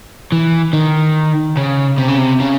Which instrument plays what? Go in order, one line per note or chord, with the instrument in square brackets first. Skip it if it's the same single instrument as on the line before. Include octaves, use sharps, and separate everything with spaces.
[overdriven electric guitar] E3
D#3
C#3
C3
C#3
C3
C#3